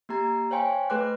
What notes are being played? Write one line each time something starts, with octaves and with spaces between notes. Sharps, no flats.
A#3 G4 A#5 G#6
C5 C#5 F5 G5 G#5 C6
A3 G#4 B4 C6 D6 F#6